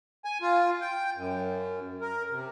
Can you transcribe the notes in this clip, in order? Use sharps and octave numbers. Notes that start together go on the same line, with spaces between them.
G#5
F4
G5
F#2
A#4
C3